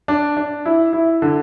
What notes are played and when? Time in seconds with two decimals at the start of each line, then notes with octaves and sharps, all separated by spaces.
0.08 D4
0.37 D4
0.66 E4
0.93 E4
1.22 D3